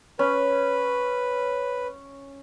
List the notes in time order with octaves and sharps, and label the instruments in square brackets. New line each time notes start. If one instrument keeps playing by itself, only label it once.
[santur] C#4 [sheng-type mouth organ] B4